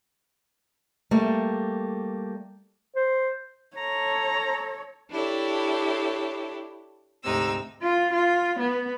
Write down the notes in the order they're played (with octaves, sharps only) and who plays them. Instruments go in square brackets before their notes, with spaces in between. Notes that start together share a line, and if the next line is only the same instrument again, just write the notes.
[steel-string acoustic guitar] G3 A3 A#3
[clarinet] C5
[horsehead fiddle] A4 C#5 [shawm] A#5
[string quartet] D4 E4 G4 A4 C#5
D2 G#2 C3 D#4 E6
[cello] F4
F4
B3